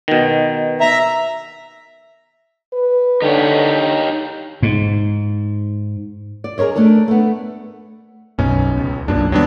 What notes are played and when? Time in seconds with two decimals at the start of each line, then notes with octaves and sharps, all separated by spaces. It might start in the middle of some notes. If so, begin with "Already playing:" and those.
0.08 B2 D#3
0.80 E5 A#5
2.73 B4
3.22 D3 D#4 G4 C#5
4.62 G#2
6.44 D5
6.58 G#4 A#4 C5 C#5 D#5
6.76 A3 D4 A4 A#4
7.08 A3 B3
8.39 B1 F#2 B2 C#4
8.77 C#2
9.08 B1 F#2 A#2 D4
9.32 D#2 F#3 G3 B3 D4